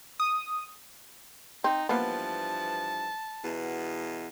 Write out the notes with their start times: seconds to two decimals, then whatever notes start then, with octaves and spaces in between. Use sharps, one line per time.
0.20 D#6
1.64 C4 D#4
1.89 G2 E3 F3 A#3 B3 A5
3.44 E2 B2